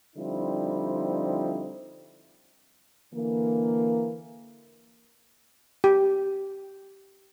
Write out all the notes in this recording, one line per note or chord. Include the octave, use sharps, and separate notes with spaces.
D3 F3 G3 C4 D#4 E4
D3 E3 A#3
G4